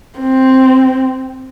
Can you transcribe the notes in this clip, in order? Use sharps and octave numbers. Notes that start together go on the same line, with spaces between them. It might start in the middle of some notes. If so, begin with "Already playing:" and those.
C4